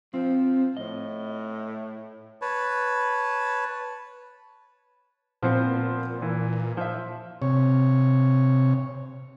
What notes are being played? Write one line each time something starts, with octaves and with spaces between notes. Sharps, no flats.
F3 C4
A2 D#5
B4 C#5 A5
A#2 F3 B3 C4
E3
F3 E5
C3 C#5